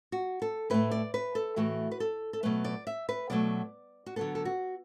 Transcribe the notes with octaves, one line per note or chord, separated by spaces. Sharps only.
F#4
A4
A2 A3 B4
D5
B4
A4
A2 E3 A3 F#4
B4
A4
A4
B2 F#3 A3 B4
D5
E5
B4
B2 F#3 A3 D5
F#4
D3 F#3 B3 A4
A4
F#4